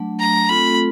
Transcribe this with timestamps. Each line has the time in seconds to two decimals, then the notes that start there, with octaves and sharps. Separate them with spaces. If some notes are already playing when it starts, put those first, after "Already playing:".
Already playing: F#3 A3 D4
0.20 A#5
0.49 A3 C4 F4 A4 B5